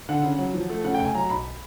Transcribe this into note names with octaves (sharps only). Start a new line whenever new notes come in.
D3 F#5
C#3
F#3
F3
A3
C#3 F#5
F1 G5
G#5
F#3 A#5
B1 B5